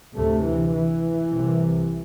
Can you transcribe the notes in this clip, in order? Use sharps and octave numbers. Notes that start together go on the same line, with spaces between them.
D2 C3 A3
E3
E3
C2 C3